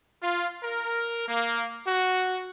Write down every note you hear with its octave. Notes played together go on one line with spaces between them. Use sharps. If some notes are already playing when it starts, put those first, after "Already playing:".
F4
A#4
A#3
F#4